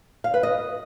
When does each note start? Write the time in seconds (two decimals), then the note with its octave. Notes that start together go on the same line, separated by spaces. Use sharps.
0.24 F5
0.34 B4
0.43 D#5